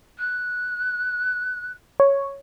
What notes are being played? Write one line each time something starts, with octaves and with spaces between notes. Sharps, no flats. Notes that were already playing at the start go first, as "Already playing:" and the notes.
F#6
C#5